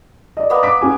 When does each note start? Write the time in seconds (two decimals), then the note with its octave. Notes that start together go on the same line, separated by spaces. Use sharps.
0.37 D5 D#5
0.50 A#3 B3
0.63 D6 B6
0.81 C#4 G4 G#5